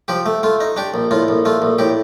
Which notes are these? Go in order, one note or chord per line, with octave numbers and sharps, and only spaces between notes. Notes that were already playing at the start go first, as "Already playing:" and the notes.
F3 G4
A3
A3 F4
D#4
D4 G4
A#1
A2 F4
A#1
A3 F4
A#1
A2 G4